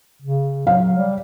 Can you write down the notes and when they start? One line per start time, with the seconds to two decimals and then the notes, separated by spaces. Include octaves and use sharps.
0.22 C#3
0.67 F#3 F5
0.98 G3